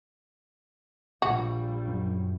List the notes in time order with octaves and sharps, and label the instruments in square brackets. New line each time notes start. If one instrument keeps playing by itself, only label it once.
[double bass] A#1 G3 [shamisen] F#4
[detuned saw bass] F#2